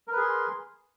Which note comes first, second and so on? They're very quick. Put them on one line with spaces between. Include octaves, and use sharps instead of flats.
A#4 B4 G#4 C6